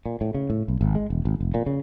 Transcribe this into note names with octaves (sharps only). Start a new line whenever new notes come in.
A#2
A2
C#3
A2
B1
G#1
G#3
E1
G#1
F1
A#2
C#3